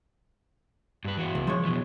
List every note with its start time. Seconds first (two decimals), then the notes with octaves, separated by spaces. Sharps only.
1.05 G2 B4
1.17 E3 F#4
1.35 C#2
1.47 F3 G#3 C#5
1.65 B2 E3